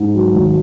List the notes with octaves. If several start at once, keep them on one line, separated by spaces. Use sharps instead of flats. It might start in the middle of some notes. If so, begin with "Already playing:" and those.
Already playing: G#2
F#3
G#1